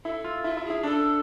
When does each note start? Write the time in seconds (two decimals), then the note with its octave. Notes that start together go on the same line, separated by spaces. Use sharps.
0.04 E4 A4
0.24 F4
0.44 E4 F4
0.57 E4
0.65 G#4
0.70 E4
0.83 D4 A4